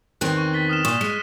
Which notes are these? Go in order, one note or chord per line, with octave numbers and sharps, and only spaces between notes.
E2 D#3 C4 F#6
C#6
A6 B6 G7
D#6 F6 E7
A#2 C#6 D#6 E7
G#3